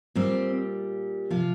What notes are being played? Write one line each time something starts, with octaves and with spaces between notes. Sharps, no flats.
A#2 G3 C4
C3 F3 F4